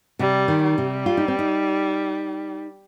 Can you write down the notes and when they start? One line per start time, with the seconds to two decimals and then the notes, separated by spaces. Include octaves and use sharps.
0.19 C3 G3
0.48 D#3
0.64 G3
0.78 C3
1.06 F4
1.17 D#4
1.28 C4
1.39 D#4